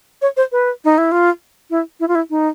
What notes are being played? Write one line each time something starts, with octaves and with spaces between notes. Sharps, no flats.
C#5
C5
B4
D#4
E4
F4
E4
E4
F4
E4
D#4